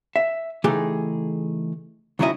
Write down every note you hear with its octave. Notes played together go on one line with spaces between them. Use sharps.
E5
C#3 E3 A3 D#4 G4 G#4
C#2 D#3 F#3 C#4 E4 D#5